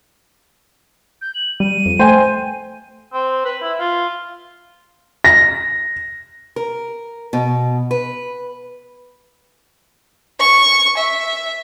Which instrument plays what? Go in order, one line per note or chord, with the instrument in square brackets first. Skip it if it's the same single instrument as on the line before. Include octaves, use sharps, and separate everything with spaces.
[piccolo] G6
F#7
[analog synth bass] G3 [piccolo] D#7
[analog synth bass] F2
[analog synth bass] A3 [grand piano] C5 G5 G#5
[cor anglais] C4
B4
E4
F4
[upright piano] A#6
[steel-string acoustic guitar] A#4
B2
B4
[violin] C#6
E5